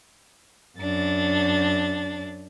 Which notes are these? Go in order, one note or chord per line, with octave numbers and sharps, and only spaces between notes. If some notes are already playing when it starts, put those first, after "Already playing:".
F#2 D4 A6